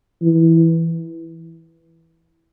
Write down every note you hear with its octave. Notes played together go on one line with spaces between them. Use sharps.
E3